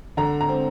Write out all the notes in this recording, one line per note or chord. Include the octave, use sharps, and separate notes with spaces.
D3 A#5
A#5
C4